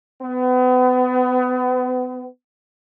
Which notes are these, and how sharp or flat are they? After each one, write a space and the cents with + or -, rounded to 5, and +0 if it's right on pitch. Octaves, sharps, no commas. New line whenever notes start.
B3 +35